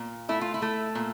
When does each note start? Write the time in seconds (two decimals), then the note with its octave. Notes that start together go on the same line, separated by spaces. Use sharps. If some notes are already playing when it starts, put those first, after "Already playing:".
Already playing: A#2
0.29 A3 E4
0.41 F4
0.54 E4
0.62 A3
0.95 A#2